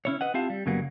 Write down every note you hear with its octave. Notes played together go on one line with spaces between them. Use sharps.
C#4 E4 C#5
B4 D#5 F#5
C4 E4 F4 G4 F5 A5
G3
F#2 C#3 F#3 G3 A#3 B3